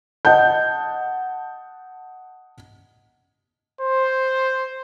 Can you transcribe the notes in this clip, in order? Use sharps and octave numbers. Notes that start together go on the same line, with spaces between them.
D#5 F#5 A5 G6
C5